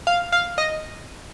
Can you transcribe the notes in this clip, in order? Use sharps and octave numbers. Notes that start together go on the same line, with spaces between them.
F5
F5
D#5